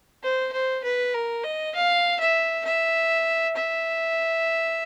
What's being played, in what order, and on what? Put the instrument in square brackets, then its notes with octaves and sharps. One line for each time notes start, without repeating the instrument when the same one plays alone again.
[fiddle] C5
C5
B4
A#4
D#5
F5
E5
E5
E5